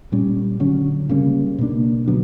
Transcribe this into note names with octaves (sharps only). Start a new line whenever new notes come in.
A#2 G3 C#4
D3 F#3 C#4
C#3 G3 A#3 C#4
B2 A#3 D4
D3 F#3 B3 D4